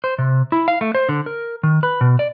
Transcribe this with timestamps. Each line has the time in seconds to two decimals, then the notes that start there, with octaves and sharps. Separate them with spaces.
0.04 C5
0.19 C3
0.52 E4
0.68 F5
0.81 A3
0.95 C5
1.09 D3
1.26 A#4
1.63 D#3
1.83 B4
2.01 B2
2.19 D5